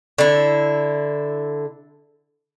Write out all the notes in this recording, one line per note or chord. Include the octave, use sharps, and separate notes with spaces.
D3 E4